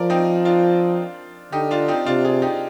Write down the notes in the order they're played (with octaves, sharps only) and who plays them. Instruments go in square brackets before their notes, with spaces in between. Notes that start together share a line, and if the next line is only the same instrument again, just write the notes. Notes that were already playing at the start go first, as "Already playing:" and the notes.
Already playing: [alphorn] F3 [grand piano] A#4 D5
[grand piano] C4 D#4
D4 F4
[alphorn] D3 [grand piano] D#4 G4
[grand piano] D4 F4
C4 D#4
[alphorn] C3 [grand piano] D4 F4
[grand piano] F4 G#4
D#4 G4